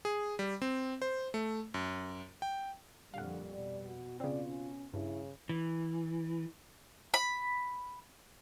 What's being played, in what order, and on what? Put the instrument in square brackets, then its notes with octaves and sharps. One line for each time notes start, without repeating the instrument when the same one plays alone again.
[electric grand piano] G#4
G3
C4
C5
A3
F#2
G5
[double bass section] F2 A#2 [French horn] D3 [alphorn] G3 [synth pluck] F5 F#5
[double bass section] B2 [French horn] D5
[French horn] F#4
[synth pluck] C#3 C4 [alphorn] F4 [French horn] D5
[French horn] C#4
[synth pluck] G2 [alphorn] C#3 [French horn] E4
[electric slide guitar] E3
[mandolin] B5